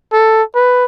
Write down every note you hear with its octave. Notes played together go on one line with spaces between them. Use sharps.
A4
B4